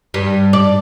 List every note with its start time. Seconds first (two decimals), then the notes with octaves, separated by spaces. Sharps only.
0.14 G2
0.53 D5